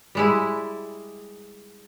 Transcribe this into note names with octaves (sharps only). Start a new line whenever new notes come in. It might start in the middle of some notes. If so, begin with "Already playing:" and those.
G3 G#3 E4